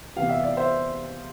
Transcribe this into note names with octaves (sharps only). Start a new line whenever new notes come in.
C3 E3 B3 F5
E5
D5
C5 E5